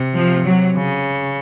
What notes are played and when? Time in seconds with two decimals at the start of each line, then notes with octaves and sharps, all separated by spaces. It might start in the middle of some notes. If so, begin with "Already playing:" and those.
Already playing: C3
0.16 F3
0.46 F#3
0.77 C#3